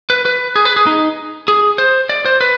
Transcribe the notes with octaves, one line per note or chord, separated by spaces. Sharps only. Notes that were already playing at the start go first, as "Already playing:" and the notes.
B4
B4
G#4
B4
G#4
D#4
G#4
C5
D5
C5
B4